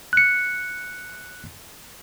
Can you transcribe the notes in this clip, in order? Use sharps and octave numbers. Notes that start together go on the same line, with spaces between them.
F#6 C#7